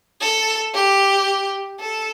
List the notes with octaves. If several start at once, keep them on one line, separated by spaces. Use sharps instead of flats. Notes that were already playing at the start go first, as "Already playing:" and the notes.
A4
G4
A4